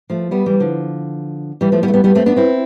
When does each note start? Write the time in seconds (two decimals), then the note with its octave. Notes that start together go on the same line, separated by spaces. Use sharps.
0.10 F3 A3
0.31 G3 B3
0.46 E3 G3
0.60 D3 F3
1.61 E3 G3
1.72 F3 A3
1.83 G3 B3
1.88 A3
1.94 G3 B3
2.04 G3 B3
2.15 A3 C4
2.26 B3 D4
2.36 C4 E4